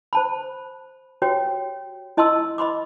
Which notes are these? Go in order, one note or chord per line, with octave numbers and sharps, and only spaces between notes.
C5 A5 B5
F#4 G4 C#5 G5
E4 D#5 A5 C6 C#6 E6
D#5 B5 C6 D6